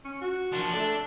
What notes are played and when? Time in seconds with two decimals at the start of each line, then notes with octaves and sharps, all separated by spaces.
0.05 C#4
0.21 F#4
0.52 F3 D4
0.74 A3 D4